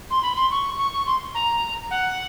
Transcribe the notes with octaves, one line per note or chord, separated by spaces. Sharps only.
C6
B5
C6
C#6
C#6
C#6
C6
A#5
F#5